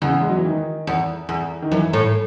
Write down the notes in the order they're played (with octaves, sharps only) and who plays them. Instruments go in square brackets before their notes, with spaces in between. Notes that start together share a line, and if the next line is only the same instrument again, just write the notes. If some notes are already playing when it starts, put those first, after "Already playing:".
[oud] E2 [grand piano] C#3
[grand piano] G#3
F#3
E3
D#3
[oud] E2
E2
[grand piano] D#3
[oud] F#2 [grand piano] E3
[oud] A2